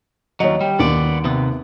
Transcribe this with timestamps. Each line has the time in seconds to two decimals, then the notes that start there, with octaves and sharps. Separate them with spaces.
0.40 D#2 F#3 C#5 D#5
0.61 G3
0.79 D#2 D#3 B3 D5
1.25 C3 B3